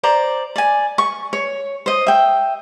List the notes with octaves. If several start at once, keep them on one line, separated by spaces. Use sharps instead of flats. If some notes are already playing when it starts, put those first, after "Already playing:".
C5 D5 A#5
D5 G#5
C#6
C#5
C5 D#5
E5 G5